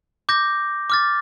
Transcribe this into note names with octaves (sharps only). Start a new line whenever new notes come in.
D6 G6 A#6
D6 F6 A6